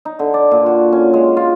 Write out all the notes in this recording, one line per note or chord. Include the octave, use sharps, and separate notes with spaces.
D#4
D3
D5
A#2
F#4
C#4
G#3
F4